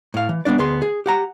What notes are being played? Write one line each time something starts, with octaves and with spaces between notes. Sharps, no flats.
A2 F5
E3
G#3 B3 C#4 D4 D5
D2 B3 G#4 C6
G#4
G4 F#5 A#5